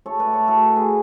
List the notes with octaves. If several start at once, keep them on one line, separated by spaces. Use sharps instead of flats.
A2 A4 C#5
B4 D5
A3
A4 C#5
A2 F#4 A4
A2
G#4 B4